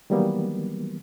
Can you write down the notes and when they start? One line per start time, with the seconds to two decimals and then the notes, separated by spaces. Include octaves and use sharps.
0.10 D#3 E3 F#3 G3 A#3 B3